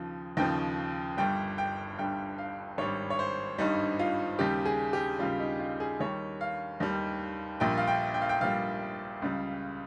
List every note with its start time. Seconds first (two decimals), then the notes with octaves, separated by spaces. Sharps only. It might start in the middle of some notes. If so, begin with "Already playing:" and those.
Already playing: D#2 C#3 F3
0.37 D#2 C#3 F3 G5
1.17 G1 G2 G3 G5
1.58 G5
1.98 G1 G2 G3 G5
2.38 F5
2.78 G#1 G2 G3 C#5
3.10 C#5
3.19 C5
3.58 G#1 G2 G3 D#4
3.99 F4
4.39 D#2 C#3 G3 G4
4.65 G#4
4.93 G4
5.19 D#2 C#3 G3 F4
5.40 D#4
5.59 F4
5.80 G#4
6.00 D#2 D#3 G3 C#5
6.41 F5
6.80 D#2 D#3 G3
7.60 A#1 A#2 G3 G5
7.77 F5
7.88 G5
8.14 G5
8.21 F5
8.29 G5
8.41 A#1 A#2 G3 F5
9.22 C#2 C#3 G3